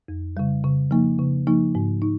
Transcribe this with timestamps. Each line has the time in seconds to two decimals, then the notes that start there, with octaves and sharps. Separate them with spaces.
0.08 F2
0.37 C#3 G3
0.64 C#3
0.91 F3 A#3 D#4
1.19 C#3
1.47 F3 A#3 D#4
1.75 G#2
2.02 D#4